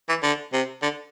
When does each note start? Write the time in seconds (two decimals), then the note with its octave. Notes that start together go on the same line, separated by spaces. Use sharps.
0.09 E3
0.23 D3
0.53 C3
0.82 D3